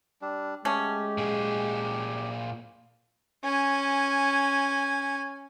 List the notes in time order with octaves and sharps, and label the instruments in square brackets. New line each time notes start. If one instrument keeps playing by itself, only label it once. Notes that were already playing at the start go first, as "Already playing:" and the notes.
[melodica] G3 D4
[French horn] G#3 [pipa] A3 C#4 [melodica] G4
[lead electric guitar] A#2 G#4
[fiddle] C#4 G#5